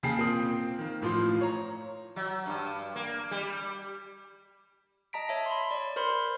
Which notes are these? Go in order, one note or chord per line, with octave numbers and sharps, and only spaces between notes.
D#2 C#3 G#4 G5 A5 C7
A#2 A#3 C4 G5 D#6
D#3 A#3
A1 A2 F3 F4 C6
C#5 A#5
F#3
G2
A#3
G3
D#5 A5 A#5 B6 D7
C#5 E5 A5 B6
B5 C6
D5
A#4 C5 B5 C6